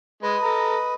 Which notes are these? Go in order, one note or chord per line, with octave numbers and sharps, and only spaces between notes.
G#3 B4 D#5
A4 A#5